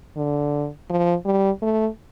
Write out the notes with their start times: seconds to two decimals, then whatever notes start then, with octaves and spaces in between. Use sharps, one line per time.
0.17 D3
0.90 F3
1.26 G3
1.62 A3